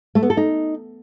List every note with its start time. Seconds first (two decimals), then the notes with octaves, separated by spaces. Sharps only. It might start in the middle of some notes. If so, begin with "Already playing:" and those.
0.15 A3
0.23 B3
0.30 A4
0.37 D#4